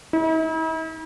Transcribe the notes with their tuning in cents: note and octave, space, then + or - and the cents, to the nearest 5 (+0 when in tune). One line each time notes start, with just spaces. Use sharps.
E4 -45